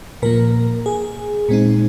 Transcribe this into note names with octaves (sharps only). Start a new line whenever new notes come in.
A#2 F3 A#3 A#4
G#4
A#2 G#3 C4 D#4